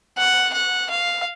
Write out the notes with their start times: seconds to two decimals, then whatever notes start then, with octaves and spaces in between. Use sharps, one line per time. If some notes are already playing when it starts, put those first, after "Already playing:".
0.18 F#5
0.54 F#5
0.90 F5